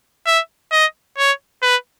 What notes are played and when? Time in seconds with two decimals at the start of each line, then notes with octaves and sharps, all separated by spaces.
0.26 E5
0.72 D#5
1.18 C#5
1.62 B4